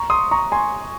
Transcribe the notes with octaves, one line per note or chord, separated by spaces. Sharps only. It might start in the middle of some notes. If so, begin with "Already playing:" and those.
Already playing: A#5 C#6
C6 D#6
A#5 C#6
G#5 C6